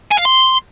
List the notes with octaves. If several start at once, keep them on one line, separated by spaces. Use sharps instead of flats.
G#5
F5
C6